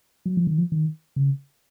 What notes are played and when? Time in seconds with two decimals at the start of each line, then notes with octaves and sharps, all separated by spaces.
0.26 F#3
0.37 F3
0.47 D#3
0.58 F3
0.72 D#3
1.16 C#3